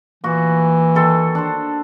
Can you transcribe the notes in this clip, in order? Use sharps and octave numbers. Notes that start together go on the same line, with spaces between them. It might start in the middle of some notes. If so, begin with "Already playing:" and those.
A#2 E3 F#4
D#3 A4 C6
D4 C5